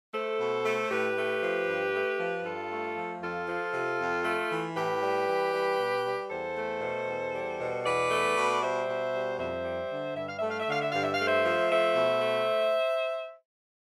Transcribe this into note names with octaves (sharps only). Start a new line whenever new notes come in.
A3 A4 C5
B2
A3
A2 G4 B4
A3
F3
G2
A3
F3
G2 F4 A4
A3
F3
F2 F4 A4
F3
C3
F2
A3
E3
A2 G4 B4
G3
E3
G3
B2
G3
E2 A4 C5
A3
B2
E2
G3
B2
E2 B4 D5
A3
B2
G3 C5 E5
B2
G3
F2 C5 E5
G3
D3
G2 E5
F5
A3 E5
F5
E5
D3 F5
E5
G2 F5
E5
A3 F5
C5 E5
F3
A3 C5 E5
B2
A3